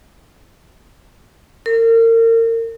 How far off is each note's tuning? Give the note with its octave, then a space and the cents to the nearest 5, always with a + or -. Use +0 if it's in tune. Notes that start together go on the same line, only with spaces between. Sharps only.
A#4 -35